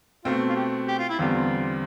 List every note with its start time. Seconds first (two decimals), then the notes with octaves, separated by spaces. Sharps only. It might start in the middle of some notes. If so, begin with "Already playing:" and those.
0.25 B2 A3 C4 F4
0.49 F4
0.56 G4
0.88 G4
0.99 F4
1.09 E4
1.19 E2 D3 G3 C4 F4